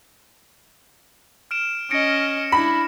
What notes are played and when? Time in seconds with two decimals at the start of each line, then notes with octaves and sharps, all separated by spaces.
1.51 F6 D7 E7
1.91 C#4 D#5 A#6 C#7 D7
2.52 D4 E4 B5